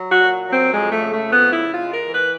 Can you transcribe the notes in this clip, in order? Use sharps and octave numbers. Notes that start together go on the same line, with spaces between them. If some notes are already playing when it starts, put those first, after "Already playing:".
Already playing: F#3
F#4
A#2
F#3
C4
F2 G#3
A3
C#3
A3
F2
B3
C#3 E4
F4
G#3
A#4
E3
B4